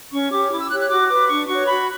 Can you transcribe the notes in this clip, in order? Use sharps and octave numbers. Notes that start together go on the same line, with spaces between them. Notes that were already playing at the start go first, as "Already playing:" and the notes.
C#4 C#6
G4 C#5 D6
E4 D6
E6
G4 C#5 F#6
F#6
F#4 D6
B4 D6
D4 C#6
F#4 C#5 C#6
F#4 B5